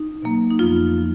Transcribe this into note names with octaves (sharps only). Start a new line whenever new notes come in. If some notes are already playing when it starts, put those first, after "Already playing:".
Already playing: D#4
B2 F#3 A#3
D#4
F2 F3 B3 F4
F3